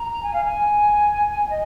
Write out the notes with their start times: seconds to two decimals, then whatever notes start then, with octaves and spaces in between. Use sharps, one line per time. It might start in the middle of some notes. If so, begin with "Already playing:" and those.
Already playing: A#5
0.23 G#5
0.33 F5
0.45 G#5
1.49 D#5